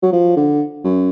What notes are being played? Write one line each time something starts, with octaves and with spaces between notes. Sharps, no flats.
F#3
F3
D3
F#2